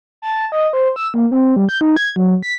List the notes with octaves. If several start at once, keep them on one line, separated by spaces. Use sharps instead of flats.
A5
D#5
C5
E6
A#3
C4
G3
G6
D#4
G#6
F#3
B6